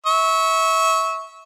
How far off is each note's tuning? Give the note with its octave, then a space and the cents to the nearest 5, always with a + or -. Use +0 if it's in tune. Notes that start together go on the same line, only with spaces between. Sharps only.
E5 -25 C#6 +0